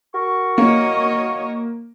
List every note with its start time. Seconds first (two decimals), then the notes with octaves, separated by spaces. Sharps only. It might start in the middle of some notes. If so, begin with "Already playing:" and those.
0.14 F#4 A#4 C#6
0.58 A#3 C#5 D#5